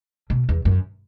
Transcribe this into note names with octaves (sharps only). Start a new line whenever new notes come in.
B2
E2
F#2